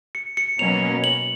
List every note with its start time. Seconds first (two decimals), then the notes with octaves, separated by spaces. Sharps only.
0.15 C#7
0.37 C#7
0.59 B2 F#3 A#3 C#4 F7
1.04 F#7